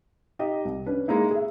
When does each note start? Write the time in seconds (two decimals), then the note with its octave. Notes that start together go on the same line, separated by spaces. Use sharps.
0.39 D#4 G4 D#5
0.65 C2
0.86 C#4 D4 B4
1.08 G#3 A#3 D#4 E4
1.31 G#4 E5